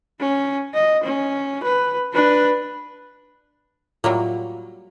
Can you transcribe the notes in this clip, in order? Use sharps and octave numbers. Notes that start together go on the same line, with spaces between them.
C#4
D#5
C#4
B4
D4 B4
A2 F#3 G3 A#3 F4